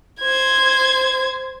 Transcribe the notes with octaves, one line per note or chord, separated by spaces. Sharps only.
C5 G#6